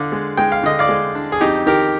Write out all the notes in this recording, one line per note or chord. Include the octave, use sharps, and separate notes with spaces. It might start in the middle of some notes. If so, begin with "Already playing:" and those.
Already playing: D3 D4 D5 F5
G#3
G#3 G5
F5
D3 D#5
D5 F5
G#3
D4
G#4
F2 D#4 G4
D#3 G4 A#4